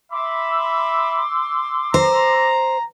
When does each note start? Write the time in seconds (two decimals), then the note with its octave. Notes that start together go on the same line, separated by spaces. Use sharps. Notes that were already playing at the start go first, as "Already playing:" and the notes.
0.12 E5 B5 C6 D6 E6
1.94 C5 A#5